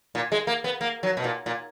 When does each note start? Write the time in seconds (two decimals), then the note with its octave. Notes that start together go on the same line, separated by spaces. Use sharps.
0.15 A#2
0.32 G#3
0.47 A#3
0.64 B3
0.81 A#3
1.03 F#3
1.17 B2
1.24 A#2
1.46 A#2